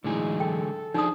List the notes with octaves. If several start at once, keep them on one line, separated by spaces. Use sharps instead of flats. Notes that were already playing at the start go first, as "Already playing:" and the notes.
A2 D3 E3 F#3 G#3 D#4 G#4
A4 G5
F3 D4 D#4 G#4 C5 D5 D#6